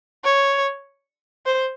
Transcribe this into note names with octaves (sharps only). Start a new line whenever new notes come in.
C#5
C5